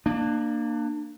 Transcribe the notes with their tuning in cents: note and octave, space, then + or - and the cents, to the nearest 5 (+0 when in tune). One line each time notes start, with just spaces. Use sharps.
A#3 +0 D4 +30